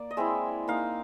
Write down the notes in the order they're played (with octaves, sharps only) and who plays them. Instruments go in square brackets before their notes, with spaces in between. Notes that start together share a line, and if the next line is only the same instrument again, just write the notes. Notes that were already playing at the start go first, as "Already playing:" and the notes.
Already playing: [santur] A#3 D5
D#5
G#3 C4 E4 E5
A#3 D#4 F5